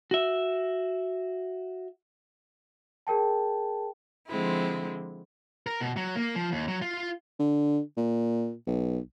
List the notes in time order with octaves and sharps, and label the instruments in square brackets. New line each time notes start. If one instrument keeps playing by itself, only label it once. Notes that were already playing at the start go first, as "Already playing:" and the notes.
[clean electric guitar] F#4 E5
[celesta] G#4 A#4 G5 A5
[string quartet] D3 F3 G#3 C4 E4
[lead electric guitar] A#4
B2
F#3
A#3
F3
D#2
F#3
F4
[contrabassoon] D3
A#2
B1